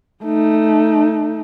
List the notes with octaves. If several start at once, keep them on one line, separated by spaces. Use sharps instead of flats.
A3 D#4